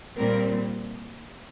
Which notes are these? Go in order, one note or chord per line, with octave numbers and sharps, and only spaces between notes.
A#2 G3 C4 A#4